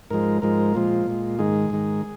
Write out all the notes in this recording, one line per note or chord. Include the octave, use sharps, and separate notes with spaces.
G#2 F3 G#3 A#4
G#2 F3 G#3 A#4
A#2 F3 G#3 F4
A#2 G#3
G#2 D#3 G#3 G#4
G#2 D#3 G#3